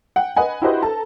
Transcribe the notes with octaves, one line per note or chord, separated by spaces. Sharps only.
F#5 G5
B4 D#5 F#5 G#5
E4 F#4 G4 B4 C5 D#5
A4 A5 A#5